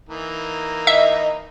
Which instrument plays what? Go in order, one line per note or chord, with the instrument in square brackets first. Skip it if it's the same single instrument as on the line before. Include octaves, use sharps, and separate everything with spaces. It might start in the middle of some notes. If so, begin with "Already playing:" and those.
[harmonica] E3 A#3 D#4
[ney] D#5 [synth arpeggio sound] E5